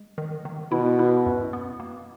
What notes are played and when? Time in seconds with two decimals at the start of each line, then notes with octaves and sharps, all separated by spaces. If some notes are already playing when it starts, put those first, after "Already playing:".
Already playing: G#3
0.18 D#3
0.45 D#3
0.72 B2 E4
0.99 E4
1.26 F#2
1.53 B3
1.80 A#3